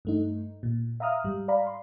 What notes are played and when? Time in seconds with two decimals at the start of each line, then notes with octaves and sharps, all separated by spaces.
0.05 G2 A3 D#4
0.63 A#2
1.00 E5 F5 A#5 D#6 F6
1.24 G#2 G3
1.48 D5 F5 A#5 B5
1.67 C6